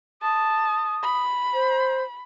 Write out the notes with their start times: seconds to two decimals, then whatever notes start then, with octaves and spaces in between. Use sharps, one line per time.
0.22 A5 D#6
1.03 B5
1.54 C5